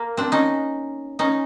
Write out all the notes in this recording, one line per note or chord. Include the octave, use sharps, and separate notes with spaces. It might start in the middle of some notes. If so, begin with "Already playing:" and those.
Already playing: A#3
C4 D4
C#4 D#4
C#4 D#4